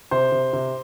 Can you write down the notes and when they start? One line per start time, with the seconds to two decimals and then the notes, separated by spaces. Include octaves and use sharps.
0.11 C3 C5
0.32 C3
0.53 C3